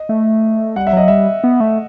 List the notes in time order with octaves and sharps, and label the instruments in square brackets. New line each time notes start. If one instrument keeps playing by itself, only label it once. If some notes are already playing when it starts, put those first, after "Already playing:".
Already playing: [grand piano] D#5
[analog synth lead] A3
[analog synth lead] G3 [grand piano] F#5
[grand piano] E5
[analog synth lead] F#3 [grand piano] D#5
[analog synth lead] G3 [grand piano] E5
[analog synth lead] B3
A3